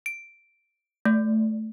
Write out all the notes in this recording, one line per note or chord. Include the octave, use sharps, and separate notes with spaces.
D7
A3